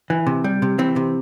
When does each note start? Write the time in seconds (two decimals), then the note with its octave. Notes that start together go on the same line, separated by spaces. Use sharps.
0.10 E3
0.27 C3
0.44 G3
0.62 C3
0.78 E3 C4
0.96 C3